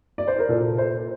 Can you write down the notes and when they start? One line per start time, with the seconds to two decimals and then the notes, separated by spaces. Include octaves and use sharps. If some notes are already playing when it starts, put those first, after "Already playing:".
0.18 D5
0.28 C5
0.39 A#4
0.49 A#2 A4
0.78 C5